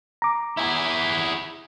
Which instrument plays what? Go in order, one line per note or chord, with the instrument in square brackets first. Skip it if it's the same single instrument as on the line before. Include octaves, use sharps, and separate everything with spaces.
[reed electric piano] A#5 D6
[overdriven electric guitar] E4 G#4